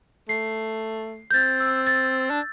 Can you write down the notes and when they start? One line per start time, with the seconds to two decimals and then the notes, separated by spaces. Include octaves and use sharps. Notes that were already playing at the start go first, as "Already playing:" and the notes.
0.29 A3 C7
1.31 G6
1.34 C4 A6
1.60 E6
1.87 A6
2.30 D4